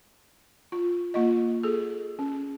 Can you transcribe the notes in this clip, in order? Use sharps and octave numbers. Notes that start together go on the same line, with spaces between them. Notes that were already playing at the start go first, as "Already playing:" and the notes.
F4
A#3 F4 D#5
G#4 A4
C#4